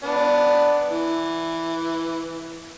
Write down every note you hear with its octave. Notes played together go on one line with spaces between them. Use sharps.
B3 D4
E3